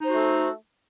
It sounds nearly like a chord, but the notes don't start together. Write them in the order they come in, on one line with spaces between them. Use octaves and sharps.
D#4 C5 F#4 A3 A4